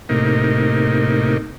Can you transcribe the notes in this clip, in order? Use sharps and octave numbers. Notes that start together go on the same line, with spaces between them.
A2 C3 A#3 D#4